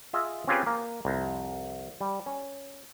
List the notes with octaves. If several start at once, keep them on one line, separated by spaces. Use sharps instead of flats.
F4 G#4 D#5 E5
C4 C#4 F4 G4 G#4 B4
A#3
C2 F2
G3
C#4